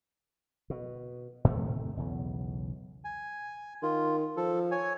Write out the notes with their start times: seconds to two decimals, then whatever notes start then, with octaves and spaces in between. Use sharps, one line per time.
0.70 B2
1.44 A2 C3 D#3 A3
1.97 B1 E2 C#3
3.04 G#5
3.82 D#3 F4
4.37 F3 A4
4.71 C#5 G#5